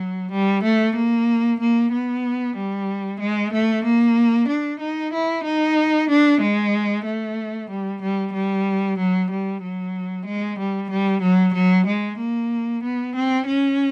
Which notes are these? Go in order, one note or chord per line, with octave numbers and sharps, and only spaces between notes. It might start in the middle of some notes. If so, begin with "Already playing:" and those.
Already playing: F#3
G3
A3
A#3
A#3
B3
G3
G#3
A3
A#3
D4
D#4
E4
D#4
D4
G#3
A3
G3
G3
G3
F#3
G3
F#3
G#3
G3
G3
F#3
F#3
G#3
A#3
B3
C4
C#4